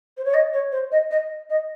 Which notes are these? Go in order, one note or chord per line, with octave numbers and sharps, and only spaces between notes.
C5
C#5
D#5
C#5
C5
D#5
D#5
D#5